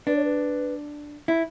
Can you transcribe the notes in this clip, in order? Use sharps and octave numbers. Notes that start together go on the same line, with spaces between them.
D4 B4
C#5
B4
E4